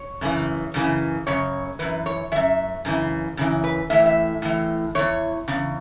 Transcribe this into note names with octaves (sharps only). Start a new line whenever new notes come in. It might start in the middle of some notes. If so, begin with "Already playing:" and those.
Already playing: C#5
F#2 C#3 E3
F#2 C#3 E3
F#2 C#3 C#5
F#2 E3 B4
C#5
F#2 E3 E5
F#2 C#3 E3
F#2 C#3 E3
B4
A2 E3 E5
E5
A2 E3
E2 C#3 E3 C#5
E2 C#3